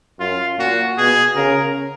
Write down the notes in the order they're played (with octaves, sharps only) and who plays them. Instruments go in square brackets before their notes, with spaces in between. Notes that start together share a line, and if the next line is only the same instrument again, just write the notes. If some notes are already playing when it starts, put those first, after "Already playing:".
[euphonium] F#2 [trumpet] F4
[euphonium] A#2 [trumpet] F#4
[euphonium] B2 [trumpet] G#4
[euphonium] C#3 [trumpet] A#4